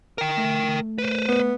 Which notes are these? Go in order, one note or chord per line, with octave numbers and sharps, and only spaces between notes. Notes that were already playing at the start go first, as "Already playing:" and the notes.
A#4 G5
A3
B4 C5
B3